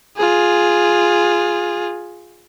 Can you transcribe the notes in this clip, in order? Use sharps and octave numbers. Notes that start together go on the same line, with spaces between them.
F4 G#4